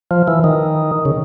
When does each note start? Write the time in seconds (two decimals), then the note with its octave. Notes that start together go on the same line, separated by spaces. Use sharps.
0.11 F3
0.28 E3
0.44 D#3
1.05 C#3